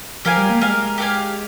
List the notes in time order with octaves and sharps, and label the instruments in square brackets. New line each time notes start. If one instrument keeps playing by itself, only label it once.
[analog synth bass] F3 [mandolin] G4 A#4 F5 G#5
[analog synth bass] G3
A#3
[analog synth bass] G#3 [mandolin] G4 A#4 F5 G#5
[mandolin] G4 A#4 F5 G#5